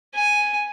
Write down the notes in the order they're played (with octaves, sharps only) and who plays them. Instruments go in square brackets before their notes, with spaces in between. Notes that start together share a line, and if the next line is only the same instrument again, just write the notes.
[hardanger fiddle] G#5